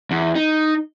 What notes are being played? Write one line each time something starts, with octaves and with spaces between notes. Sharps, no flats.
E2
D#4